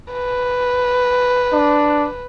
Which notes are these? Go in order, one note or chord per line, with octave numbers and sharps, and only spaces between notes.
B4
D4